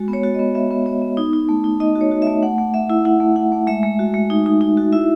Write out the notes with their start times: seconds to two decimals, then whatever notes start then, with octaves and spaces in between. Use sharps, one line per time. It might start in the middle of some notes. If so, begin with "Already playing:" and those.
Already playing: G#3 F#4
0.08 B3
0.13 C#5
0.23 F#4
0.34 D#5
0.39 B3
0.55 B3 E5
0.71 B3
0.86 B3
1.02 B3
1.17 D#4
1.33 D#4
1.49 A3
1.64 D#4
1.80 D#4 D#5
1.96 F#4
2.01 C#5
2.11 F#4
2.22 E5
2.27 A3
2.43 A3 F#5
2.58 A3
2.74 A3 E5
2.90 E4
3.05 E4 F#5
3.20 A3
3.36 E4 F#5
3.52 A3
3.67 G#3 E5
3.83 G#3
3.99 F#4
4.14 G#3
4.30 D#4
4.46 D#4
4.61 D#4
4.77 F#4
4.92 E4 E5